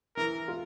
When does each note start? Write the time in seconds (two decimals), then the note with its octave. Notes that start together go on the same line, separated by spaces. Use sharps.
0.16 E3 A#4
0.48 F4